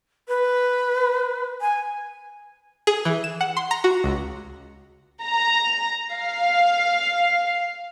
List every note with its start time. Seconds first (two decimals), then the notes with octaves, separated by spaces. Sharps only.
0.28 B4
1.61 G#5
2.87 G#4
3.05 E3
3.24 E7
3.41 F#5
3.57 C6
3.71 A#5
3.84 F#4
4.04 C#2
5.23 A#5
6.12 F5